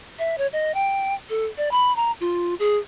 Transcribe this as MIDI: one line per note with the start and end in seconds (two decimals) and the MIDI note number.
0.19 0.36 76
0.38 0.47 73
0.53 0.74 75
0.74 1.14 79
1.29 1.46 69
1.57 1.69 74
1.71 1.94 83
1.96 2.11 82
2.20 2.54 65
2.59 2.78 68